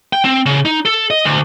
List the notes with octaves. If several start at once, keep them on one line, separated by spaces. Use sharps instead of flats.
G5
C4
C#3
D#4
A4
D#5
D2